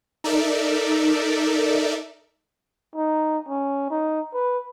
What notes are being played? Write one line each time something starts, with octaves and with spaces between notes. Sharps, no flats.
D#4 A4 A#4 D5 E5
D#4
C#4
D#4
B4